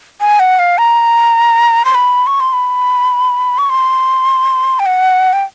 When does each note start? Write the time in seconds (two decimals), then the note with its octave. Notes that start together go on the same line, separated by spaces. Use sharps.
0.21 G#5
0.40 F#5
0.59 F5
0.78 A#5
1.85 C6
1.95 B5
2.27 C#6
2.40 C6
2.53 B5
3.58 C#6
3.70 C6
4.79 G5
4.86 F#5
5.33 G5